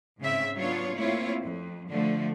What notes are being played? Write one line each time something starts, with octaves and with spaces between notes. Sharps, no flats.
G#2 C#3 C4 E5
F#3 B3 D4 F4 C#5
A3 A#3 C4 E4 F4 C#5
F2
D3 F3 A3